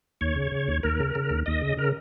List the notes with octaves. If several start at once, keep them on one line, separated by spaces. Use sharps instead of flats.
D#2 C#5
C#3
C#3
D#2
D#2 A#4
C#3
C#3
D#2
D#2 D#5
C#3
C#3 A#4